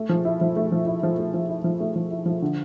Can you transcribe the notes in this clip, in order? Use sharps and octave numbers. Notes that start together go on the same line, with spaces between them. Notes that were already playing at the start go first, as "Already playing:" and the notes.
Already playing: A3
F3
E4
F3
A3
F3
E4
F3
A3
F3
E4
F3
A3
F3
E4
F3
D3